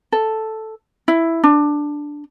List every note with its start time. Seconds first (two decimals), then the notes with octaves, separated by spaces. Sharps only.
0.12 A4
1.08 E4
1.44 D4